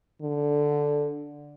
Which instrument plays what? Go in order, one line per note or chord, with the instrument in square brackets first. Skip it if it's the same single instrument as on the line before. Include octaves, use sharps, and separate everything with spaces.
[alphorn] D3